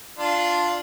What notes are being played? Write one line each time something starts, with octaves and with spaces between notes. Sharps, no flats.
D4 F4